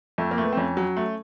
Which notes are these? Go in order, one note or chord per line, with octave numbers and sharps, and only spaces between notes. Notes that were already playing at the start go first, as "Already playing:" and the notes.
F2 A3
A#3
A3
B3
C4
F2 C#4
F#3
A3